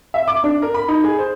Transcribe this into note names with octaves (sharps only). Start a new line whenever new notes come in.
E5
D6
D4
A#4
B5
D#4
G#4
C5